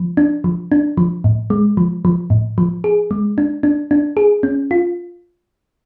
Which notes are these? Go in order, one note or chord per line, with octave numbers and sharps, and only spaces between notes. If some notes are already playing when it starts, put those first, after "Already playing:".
Already playing: F3
D4
F3
D4
F3
A2
G#3
F3
F3
A2
F3
G#4
G#3
D4
D4
D4
G#4
C#4
F4